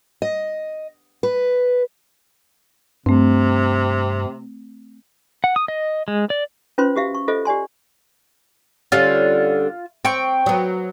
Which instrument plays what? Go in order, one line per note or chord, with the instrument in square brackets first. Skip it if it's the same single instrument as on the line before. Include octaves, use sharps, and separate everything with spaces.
[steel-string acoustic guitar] D#5
B4
[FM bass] G2 [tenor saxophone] C3 [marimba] A3 C4
[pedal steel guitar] F#5
D#6
D#5
G#3
D5
[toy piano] C#4 F4 B4 C5 C6
F#4 G4 E5 F5
C#6
F4 A4 C5 D#5 E5
G4 D5 G#5 C6
[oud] D3 G3 C#4 [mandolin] F4
[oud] C4 [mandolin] G5 C#6
[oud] F#3 B3